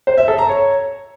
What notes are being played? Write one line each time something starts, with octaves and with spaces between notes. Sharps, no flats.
C5
E5
A4
A#5
C#5